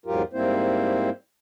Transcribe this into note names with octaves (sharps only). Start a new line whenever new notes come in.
E2 G#2 F#3 F4 G4 A#4
G#2 G3 A#3 C4 E4 C5